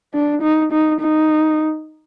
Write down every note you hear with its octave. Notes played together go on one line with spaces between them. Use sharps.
D4
D#4
D#4
D#4